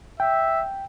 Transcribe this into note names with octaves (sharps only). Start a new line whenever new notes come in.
E5 G5